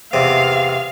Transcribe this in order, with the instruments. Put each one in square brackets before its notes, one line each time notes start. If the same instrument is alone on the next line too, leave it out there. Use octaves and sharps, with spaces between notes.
[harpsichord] E2 C3 [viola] F5